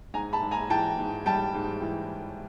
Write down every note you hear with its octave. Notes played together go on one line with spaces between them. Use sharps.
G#2 G#5 A#5
A5 B5
G#2
G#5 A#5
E3 G5 A5
G#2
G3 G5 A5
G#2
E3